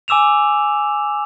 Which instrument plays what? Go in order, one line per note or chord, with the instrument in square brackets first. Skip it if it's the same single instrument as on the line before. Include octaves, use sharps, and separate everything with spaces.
[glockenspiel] G#5 D6 E6 E7 F7